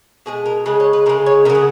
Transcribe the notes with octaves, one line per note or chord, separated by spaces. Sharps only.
B2 G#3 G#4
A#4
C#3 G#3 B4
C#5
B4
C#3 G#3 A#4
C#5
C#3 F#3 A#4
G#4